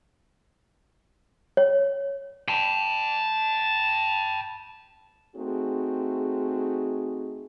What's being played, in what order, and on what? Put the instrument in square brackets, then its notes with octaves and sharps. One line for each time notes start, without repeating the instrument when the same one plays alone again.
[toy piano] C#5
[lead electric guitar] G5 A5
[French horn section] A3 C4 D#4 F#4 G#4